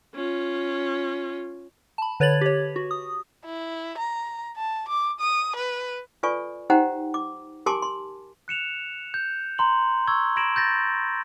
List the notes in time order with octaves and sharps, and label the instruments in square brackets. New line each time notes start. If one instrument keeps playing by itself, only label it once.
[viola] C#4 F4
[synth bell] A5 B5
D3 B4 C#5 G#6 A6 F#7
G4 C#5
F#4
D#6
[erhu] E4
A#5
A5
D6
D#6
B4
[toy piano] F4 A4 B4 D5 G#5 C#6
D#4 G4 C5 F#5 G5 A#5
D6
G4 A#4 G#5 A5 C6 D6
C6
[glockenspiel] F#6 C#7 E7 F7
G6
A#5 C6 F#7
C#6 E6 G#6 G7
B5 G#6 A#6 D7 E7 F#7
G6 A6 A#6